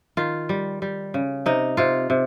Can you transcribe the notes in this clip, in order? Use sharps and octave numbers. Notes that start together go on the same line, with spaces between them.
D#3 F4
G3
G3
C#3
C3 D#4
C3 F4
C3